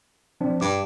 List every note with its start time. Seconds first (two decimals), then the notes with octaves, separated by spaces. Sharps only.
0.41 F3 C4 D4
0.61 G2 D6